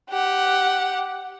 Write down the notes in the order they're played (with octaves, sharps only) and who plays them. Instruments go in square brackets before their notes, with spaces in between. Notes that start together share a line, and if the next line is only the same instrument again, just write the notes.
[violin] G4 F#5